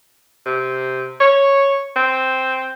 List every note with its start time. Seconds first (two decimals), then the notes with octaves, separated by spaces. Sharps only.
0.46 C3
1.20 C#5
1.96 C4